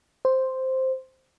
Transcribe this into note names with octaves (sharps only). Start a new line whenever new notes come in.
C5